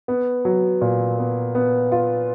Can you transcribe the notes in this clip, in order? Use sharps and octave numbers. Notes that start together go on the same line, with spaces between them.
B3
F#3
A#2
B3
B3
F4